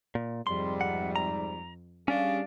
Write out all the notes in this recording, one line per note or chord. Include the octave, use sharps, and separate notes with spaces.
A#2
F2 G#2 C3 G3 C6
F#5
A#5
G3 C#4 D4 G#4 F5